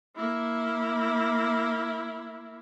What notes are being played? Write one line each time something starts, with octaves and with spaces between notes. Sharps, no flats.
A#3 E4